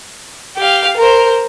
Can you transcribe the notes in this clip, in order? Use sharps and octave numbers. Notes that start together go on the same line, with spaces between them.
G4 F5
A#4 C5